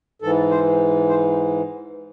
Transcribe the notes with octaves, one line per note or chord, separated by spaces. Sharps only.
G#2 E3 A4
C5
C5